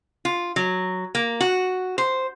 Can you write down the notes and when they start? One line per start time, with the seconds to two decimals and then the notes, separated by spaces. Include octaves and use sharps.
0.25 F4
0.56 F#3
1.15 A#3
1.40 F#4
1.98 C5